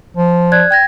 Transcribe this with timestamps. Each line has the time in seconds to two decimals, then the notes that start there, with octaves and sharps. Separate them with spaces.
0.17 F3
0.52 D5 F#6 G#6
0.71 G5 G#6 A#6